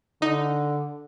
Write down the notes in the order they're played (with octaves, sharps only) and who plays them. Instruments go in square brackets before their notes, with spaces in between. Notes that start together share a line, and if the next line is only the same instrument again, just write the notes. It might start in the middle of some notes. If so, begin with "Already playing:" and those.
[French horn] D3 [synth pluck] D#4